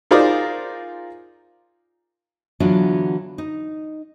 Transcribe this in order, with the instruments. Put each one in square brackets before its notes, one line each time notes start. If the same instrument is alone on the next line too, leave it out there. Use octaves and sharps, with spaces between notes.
[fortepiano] D#4 F4 G#4 A#4 C5 D5
[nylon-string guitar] D3 E3 F#3 B3 D4 F4
D#4